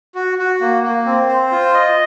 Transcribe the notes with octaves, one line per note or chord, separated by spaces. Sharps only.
F#4
F#4
A#3
A#3
C4
C5
F4
D#5